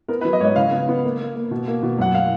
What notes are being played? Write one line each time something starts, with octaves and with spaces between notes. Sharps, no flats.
B3 A#4
B4
F#3
D#5
G#2 C#5 D#5
C#3 F5
B3
B3
A#3
A#3
A#3
B2
A#3
B2
F#2 F#5
F5